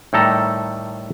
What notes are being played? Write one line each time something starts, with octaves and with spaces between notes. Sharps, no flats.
A2 D#3 G3 G4 A4 A#5